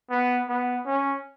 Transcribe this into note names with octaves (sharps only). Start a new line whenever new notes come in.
B3
B3
C#4